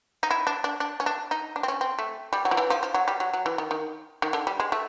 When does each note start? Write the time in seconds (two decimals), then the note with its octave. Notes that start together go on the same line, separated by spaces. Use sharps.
0.23 D#4
0.31 E4
0.47 D4
0.64 D4
0.80 D4
1.00 C#4
1.06 D4
1.31 D#4
1.56 D4
1.63 C4
1.68 C#4
1.81 C4
1.99 A3
2.33 G3
2.45 F#3
2.51 F3
2.57 E3
2.70 F3
2.83 F3
2.94 F#3
3.08 G3
3.20 F#3
3.33 F#3
3.46 E3
3.58 D#3
3.71 D#3
4.22 D#3
4.33 D3
4.47 G3
4.60 G#3
4.72 A3